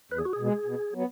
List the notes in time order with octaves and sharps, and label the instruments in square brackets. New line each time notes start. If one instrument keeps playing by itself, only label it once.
[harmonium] E2 [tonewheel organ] B4
[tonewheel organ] G#4
F#4
G#4
[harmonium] B2 G#3
B2
F#3 B3